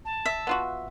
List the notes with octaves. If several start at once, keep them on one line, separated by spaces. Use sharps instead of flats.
A5
E5
B3 F4 F#4